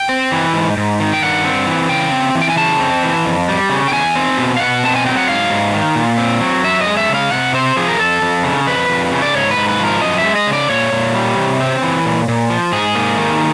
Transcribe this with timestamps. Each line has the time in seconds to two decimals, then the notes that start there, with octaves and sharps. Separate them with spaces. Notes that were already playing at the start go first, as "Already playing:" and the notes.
Already playing: G5
0.09 C4
0.32 E3
0.54 G#2
0.77 G#2
1.00 D#3
1.14 G5
1.22 G2 F#5
1.45 C4
1.67 E3
1.89 C#3 G5
2.12 C4
2.35 E3
2.42 G5
2.50 G#5
2.57 C#3 A5
2.80 C4
3.03 E3
3.25 F2
3.48 G3
3.70 C#3
3.88 G5
3.92 E2 G#5
4.16 C4
4.38 B2
4.56 F5
4.60 B2 F#5
4.83 C4 A5
4.96 G#5
5.06 F#3 G5
5.17 F#5
5.28 G#2 F5
5.50 G#2
5.73 D#3
5.96 A#2
6.18 C4
6.41 F#3
6.64 F#2 E5
6.81 D#5
6.87 G#3
6.97 E5
7.09 C#3
7.14 F5
7.31 C3 F#5
7.54 C4 C5
7.77 F3 G#4
7.88 A#4
7.99 F2 A4
8.22 F2
8.44 C#3
8.67 F2 B4
8.89 F2
9.12 C#3
9.22 D5
9.34 G#2 C#5
9.51 B4
9.57 G#2
9.68 B4
9.79 F3
9.85 A#4
10.02 F#2 D#5
10.18 E5
10.24 G#3
10.35 D#5
10.47 C#3
10.53 D5
10.69 A#2 C#5
10.92 A#2
11.15 G3
11.37 C3
11.61 C4
11.83 E3
12.05 A#2
12.28 A#2
12.50 F3
12.72 G#2 G#4
12.95 A#3
13.17 D#3